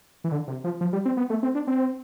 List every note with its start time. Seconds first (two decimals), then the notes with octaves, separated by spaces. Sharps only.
0.24 E3
0.32 D3
0.48 C3
0.64 F3
0.81 F3
0.93 G3
1.05 C4
1.17 B3
1.30 A3
1.43 C4
1.55 D4
1.67 C4